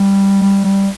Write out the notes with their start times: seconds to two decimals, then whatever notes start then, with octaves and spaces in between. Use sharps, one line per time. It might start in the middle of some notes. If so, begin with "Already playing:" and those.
Already playing: G3
0.42 G3
0.64 G3